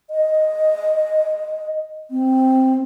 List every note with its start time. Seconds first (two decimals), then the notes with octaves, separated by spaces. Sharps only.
0.10 D#5
2.11 C4